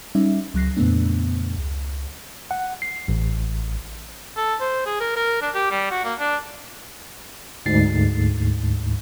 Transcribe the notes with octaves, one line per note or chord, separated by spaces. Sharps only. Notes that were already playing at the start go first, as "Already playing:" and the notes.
G3 C#4 D#4 E5
C#2 F#3 F#6 A#6 C7
F2 A#2 C#3 A3 B3 D4
C#2
F#5
C7
A1
A4
C5
G#4
A#4
A#4
D4
G4
G3
F#4
A#3
D4
D2 G#2 A6 C7